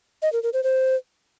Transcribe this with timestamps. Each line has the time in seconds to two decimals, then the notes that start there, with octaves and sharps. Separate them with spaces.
0.22 D#5
0.33 A#4
0.43 A#4
0.53 C5
0.63 C5